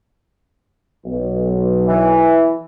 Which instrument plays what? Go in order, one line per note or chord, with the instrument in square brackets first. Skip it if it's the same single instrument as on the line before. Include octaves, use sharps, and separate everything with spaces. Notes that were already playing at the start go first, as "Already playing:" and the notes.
[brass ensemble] B1
[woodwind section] E3